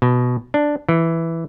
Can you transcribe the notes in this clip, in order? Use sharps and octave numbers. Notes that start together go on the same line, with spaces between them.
B2
D4
E3